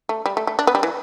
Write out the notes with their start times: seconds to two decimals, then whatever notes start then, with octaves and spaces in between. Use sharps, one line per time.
0.09 A3
0.26 G3
0.37 A3
0.47 A3
0.59 D4
0.67 B3
0.75 G3
0.83 E3